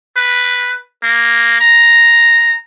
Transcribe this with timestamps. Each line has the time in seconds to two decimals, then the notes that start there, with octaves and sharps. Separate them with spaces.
0.17 B4
1.04 A#3
1.61 A#5